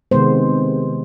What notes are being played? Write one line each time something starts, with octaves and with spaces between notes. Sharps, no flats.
C3 D#3 G#3 B3 C5